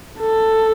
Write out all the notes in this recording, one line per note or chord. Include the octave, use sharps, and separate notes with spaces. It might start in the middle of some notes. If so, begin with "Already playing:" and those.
A4